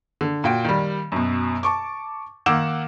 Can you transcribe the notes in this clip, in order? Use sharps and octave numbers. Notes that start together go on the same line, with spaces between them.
D3
A#2 F#4 G5
D#3 G3
F#2 B2
A5 C#6 D6
D#3 A#3 F#5 D6 E6 E7